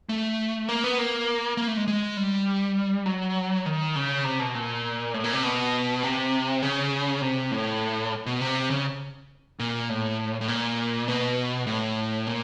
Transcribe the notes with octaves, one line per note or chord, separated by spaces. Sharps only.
A3
A#3
B3
A#3
A#3
A3
G#3
G#3
G3
F#3
D#3
C#3
C3
B2
A#2
A2
A#2
C3
B2
C3
C#3
C3
A2
B2
C3
C#3
A#2
A2
A2
A#2
B2
A2
A#2